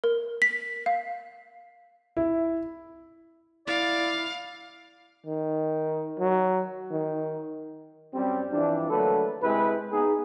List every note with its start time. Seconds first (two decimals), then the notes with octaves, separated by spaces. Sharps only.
0.04 A#4
0.42 B6
0.86 F5
2.17 E4
3.67 E4 D5 F5
5.26 D#3
6.19 F#3
6.91 D#3
8.14 F#2 G3 C4
8.51 G2 E3 F3 G3 D4
8.90 D3 F#3 A3 A#3 A4 B4
9.42 C3 G#3 E4 G4 B4
9.92 B3 D#4 G#4